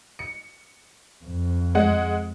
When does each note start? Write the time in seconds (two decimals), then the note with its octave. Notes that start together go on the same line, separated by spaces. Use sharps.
0.19 C#7
1.24 F2
1.75 G#3 F#5